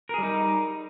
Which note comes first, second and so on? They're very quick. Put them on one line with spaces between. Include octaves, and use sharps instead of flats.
A#4 G#4 G3 D#4